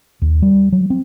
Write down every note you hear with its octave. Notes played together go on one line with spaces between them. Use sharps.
D#2
G3
F#3
C4